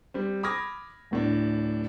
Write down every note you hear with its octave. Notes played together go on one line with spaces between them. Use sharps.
G3 C4
B5 D6 D#6 F6 G#6 A#6
D1 A2 D4